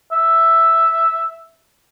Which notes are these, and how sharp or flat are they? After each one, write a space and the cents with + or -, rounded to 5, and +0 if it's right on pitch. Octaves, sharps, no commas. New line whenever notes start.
E5 +0